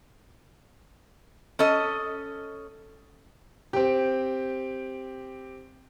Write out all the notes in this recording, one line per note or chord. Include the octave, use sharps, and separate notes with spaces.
C#4 A4 D#5
C4 G4